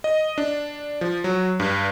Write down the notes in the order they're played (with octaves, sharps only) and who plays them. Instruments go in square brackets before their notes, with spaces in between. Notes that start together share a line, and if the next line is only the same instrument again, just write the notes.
[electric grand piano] D#5
D4
F3
F#3
G2